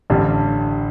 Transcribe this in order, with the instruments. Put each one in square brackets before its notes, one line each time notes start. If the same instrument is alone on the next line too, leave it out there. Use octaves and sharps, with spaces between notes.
[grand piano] A1 G2 D3 G3